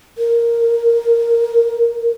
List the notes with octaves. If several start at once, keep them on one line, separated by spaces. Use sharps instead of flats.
A#4